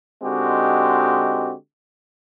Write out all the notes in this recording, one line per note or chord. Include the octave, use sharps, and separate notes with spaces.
D3 G#3 C4 D#4 F#4 G4